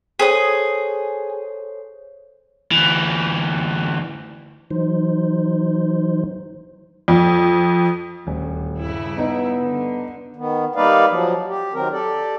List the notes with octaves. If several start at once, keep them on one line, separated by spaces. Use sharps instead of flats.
G#4 A4 C5 C#5 D#6
D2 E3
E3 F#3 D#4 C5
F2
D#1 D2
G2 C#3 E4
B3 D#4
D3
D#3 B3
G3 A#3 D#4 B4 D5 F5
F3 F#3
G4
D#3 F#3 C4 A#4
G4 A4 D5